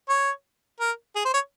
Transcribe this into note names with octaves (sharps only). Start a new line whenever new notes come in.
C#5
A#4
G#4
C5
C#5